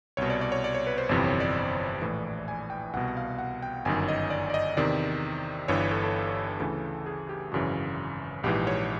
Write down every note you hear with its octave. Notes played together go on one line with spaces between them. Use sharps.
C2 B2 C#5
D5
D5
C#5
D5
C#5
B4
C5
G1 F2 C3 E3 C5
C#5
D5
A#1 A2 E3
G#5
G5
C2 B2 F#5
F#5
F5
F#5
G5
G1 F#2 D#3 G#5
D#5
D5
D5
D#5
E2 C3 D#3 D5
G1 G2 E3 C#5
B4
A4
A4
D2 C#3 E3
G#4
G4
G#1 F#2 C#3 E3 F#4
A#1 G#2 E3 G4
C#5